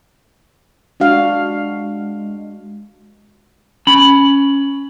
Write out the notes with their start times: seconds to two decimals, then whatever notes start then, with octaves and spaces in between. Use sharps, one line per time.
1.00 G#3 D4 F#4 F5
3.87 C#4 B5